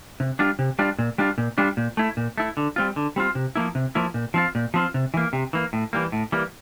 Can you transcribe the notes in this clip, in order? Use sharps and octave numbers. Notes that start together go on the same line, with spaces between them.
C3
G3 D4 F4
C3
G3 D4 F4
A#2
G3 D4 F4
A#2
G3 D4 F4
A#2
A3 E4
A#2
A3 E4
D3
G3 C4 F4
D3
G3 C4 F4
C3
F3 A#3 E4
C3
F3 A#3 E4
A#2
F3 C4 F4
A#2
F3 C4 F4
C3
E3 A#3
C3
E3 A#3
A2
E3 G3 A#3
A2
E3 G3 A#3